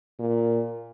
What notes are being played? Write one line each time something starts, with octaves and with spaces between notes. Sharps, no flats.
A#2